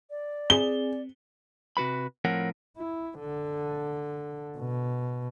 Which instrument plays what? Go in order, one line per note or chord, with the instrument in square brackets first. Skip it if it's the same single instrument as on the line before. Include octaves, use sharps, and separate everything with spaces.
[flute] D5
[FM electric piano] C4 [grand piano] G#4 [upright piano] G7
[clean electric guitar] C3 F#4 B4 B5
A2 F3 C4 A#4 C#5 F#5
[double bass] E4
D3
B2